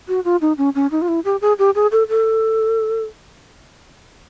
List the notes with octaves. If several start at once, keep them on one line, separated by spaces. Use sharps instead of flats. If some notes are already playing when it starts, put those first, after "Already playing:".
F#4
F4
D#4
C#4
C#4
D#4
F4
E4
G4
G#4
G4
G#4
A4
A4